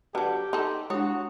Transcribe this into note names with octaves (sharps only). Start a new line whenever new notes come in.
D3 F#3 F#4 G4 B4 F#5 A5
D#4 A4 C6
G#3 D4 E4 F#4 C#5 D#6